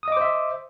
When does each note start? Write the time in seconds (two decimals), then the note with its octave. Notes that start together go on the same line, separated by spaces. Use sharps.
0.03 D#6
0.08 D#5
0.12 D6
0.17 C5
0.21 E5